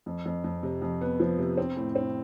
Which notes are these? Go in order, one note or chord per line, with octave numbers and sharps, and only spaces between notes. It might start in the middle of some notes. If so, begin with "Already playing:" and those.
F2
F2
F2
C3
F2
B3
F3
C3
C4
A2
C4